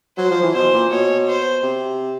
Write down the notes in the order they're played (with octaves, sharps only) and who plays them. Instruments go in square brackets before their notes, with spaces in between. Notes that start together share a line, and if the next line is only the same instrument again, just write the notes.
[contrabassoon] F#3 [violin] C5
[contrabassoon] F3
E3
[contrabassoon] B2 [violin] C5
[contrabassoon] A#2
[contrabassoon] B2 [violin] C#5
[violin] C5
[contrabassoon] C3